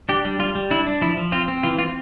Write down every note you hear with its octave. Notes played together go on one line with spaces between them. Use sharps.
D4 G4
G3
G3 F4
G3
D4 E4
D4
F3 E4
F3
C4 F4
C4
E3 F4
C4 F4